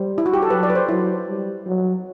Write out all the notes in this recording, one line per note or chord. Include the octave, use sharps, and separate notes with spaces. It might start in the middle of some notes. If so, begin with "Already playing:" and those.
Already playing: G3 C5
E4
F#4
G4
A4
F#3 B4
D5
B4
C5
F#3 E4
G3
F#3